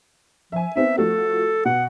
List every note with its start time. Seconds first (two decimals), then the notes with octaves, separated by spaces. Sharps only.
0.52 F3 E5 G#5
0.76 B3 C4 D#4 E5
0.98 F3 A3 F#4 A4
1.65 B2 F#5